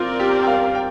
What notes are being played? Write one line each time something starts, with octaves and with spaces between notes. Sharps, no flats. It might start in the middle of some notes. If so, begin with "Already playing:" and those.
Already playing: C4 F4 A#4 D5
G4
G5
F5
G5